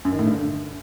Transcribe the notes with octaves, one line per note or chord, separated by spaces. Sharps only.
F#2
D#3
A2
G2
D3